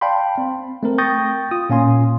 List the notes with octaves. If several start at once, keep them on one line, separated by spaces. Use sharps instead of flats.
D5 F5 G5 A5 B5 C6
C4
A3 C4 A#4
G5 C#6 D#6 G6 A6 A#6
F4 D#6
A#2 C#4 F5 G#5 C6